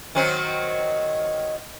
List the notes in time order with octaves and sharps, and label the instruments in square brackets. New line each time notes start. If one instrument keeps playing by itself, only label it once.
[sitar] D#3 F#3 C4